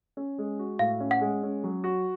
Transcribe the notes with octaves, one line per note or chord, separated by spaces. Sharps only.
C#4
G#3
F#4
A2 F5
C#4
F#5
G#3
C#4
F#3
F#4